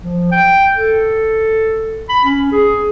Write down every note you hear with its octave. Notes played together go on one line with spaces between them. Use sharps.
F3
G5
A4
B5
C#4
G#4